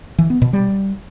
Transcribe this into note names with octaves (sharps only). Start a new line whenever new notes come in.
E3
B3
B2
G3